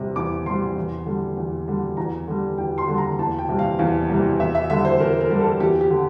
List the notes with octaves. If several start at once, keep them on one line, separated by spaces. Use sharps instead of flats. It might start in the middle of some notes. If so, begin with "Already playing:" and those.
Already playing: E2 C3 G3
E2 D6
C3 G3 C6
E2
D3 G3
E2
D3 G3
E2 A#5
D3 G3
E2 G5
C6
D3 G3
A#5
E2 A5
G5
C3 E3 G3
F5
E2 F5
C3 E3 G3
E2 E5
E5
D3 G3 E5
C5
E2 A#4
A#4
D3 G3
A4
E2 G4
G4
D3